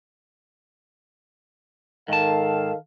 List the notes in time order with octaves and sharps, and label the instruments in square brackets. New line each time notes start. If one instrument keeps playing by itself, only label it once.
[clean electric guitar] G#2 A5 [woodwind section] D#3 [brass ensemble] A4 F5